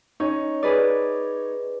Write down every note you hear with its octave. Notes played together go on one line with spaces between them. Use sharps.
C#4 D#4 C#5
G#4 B4 D5